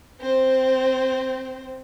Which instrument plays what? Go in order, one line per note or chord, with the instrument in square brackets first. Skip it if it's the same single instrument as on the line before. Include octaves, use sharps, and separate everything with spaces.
[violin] C4 C5